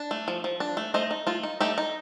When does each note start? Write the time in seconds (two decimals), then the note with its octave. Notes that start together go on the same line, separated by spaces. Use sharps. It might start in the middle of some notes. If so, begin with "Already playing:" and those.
Already playing: D4
0.11 A3
0.28 F3
0.44 F3
0.60 D4
0.77 A3
0.94 A3 C5 D#5
1.11 D#4
1.27 A3 F4
1.43 D#4
1.61 A3 D#4 G4
1.78 D#4